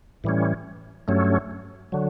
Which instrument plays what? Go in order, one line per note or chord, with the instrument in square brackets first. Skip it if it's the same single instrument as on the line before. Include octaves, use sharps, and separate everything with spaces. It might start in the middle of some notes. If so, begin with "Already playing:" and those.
[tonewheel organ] A2 E3 G3 C#4
G2 F#3 A3 C#4
D3 F#3